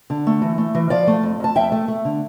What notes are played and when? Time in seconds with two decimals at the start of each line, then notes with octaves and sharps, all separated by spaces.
0.10 D3
0.27 A3
0.42 E3
0.58 A3
0.75 E3
0.90 F3 D5 F5
1.07 A3
1.23 F2
1.40 F2 A5
1.56 F2 E5 G5
1.72 A3
1.88 A3
2.05 D3